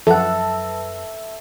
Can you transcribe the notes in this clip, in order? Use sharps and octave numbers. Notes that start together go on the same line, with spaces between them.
F#2 F3 A4 B4 E5 F#5